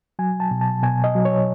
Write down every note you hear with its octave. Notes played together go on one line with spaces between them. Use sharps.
F#3 G#5
A5
B2
A5
B2 G#5
D#5
F#3
C#5